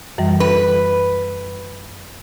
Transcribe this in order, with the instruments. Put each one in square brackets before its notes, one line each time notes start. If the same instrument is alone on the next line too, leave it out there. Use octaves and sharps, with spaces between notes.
[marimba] F#2 E3 G3
[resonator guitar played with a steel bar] B4